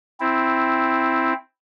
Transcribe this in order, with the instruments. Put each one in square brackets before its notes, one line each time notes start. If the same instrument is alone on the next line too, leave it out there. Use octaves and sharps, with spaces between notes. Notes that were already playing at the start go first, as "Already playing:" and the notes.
[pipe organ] C4 E4